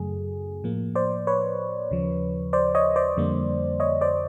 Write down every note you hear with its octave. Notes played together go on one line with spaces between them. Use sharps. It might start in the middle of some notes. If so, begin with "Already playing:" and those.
Already playing: F#2 C#3 F#3 A3 G#4
A2 F3 A#3
C5 D5
B4 C#5
D#2 C#3 F3
C5 D5
C#5 D#5
C5 D5
F2 D3 G3 A#3
C#5 D#5
C5 D5